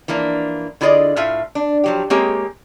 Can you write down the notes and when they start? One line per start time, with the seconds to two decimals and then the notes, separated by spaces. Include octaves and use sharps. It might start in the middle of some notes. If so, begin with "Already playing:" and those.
0.08 E3 F3 A#3 D4
0.81 D3 E4 F4 G#4 D5 D#5
1.16 A2 A3 F4 E5 F5
1.55 D4
1.84 F3 F#3 G4
2.10 G#3 A#3 C4 G4 G#4 C#5